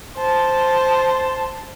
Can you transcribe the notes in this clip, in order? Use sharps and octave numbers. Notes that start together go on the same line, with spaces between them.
C5 A5